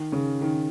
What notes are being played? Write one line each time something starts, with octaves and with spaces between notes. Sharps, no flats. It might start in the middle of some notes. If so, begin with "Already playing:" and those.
Already playing: D#3
C#3
D#3